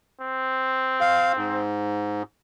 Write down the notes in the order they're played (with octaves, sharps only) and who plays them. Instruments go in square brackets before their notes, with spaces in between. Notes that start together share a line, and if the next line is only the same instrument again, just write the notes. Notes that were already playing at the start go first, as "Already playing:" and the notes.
[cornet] C4
[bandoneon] F5
G#2